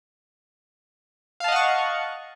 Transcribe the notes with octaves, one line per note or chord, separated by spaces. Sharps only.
D#5 F5 F#5 A5 C#6